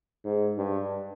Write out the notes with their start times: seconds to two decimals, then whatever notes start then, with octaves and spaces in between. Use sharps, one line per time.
0.24 G#2
0.57 G2